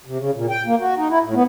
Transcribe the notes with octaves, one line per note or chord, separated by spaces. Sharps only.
C3
C#3
A#2
G5
A#3
F#4
D#4
E4
A2
B3